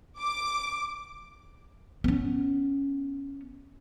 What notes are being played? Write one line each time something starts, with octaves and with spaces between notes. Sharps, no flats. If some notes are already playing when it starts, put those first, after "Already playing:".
D6
B3 C#4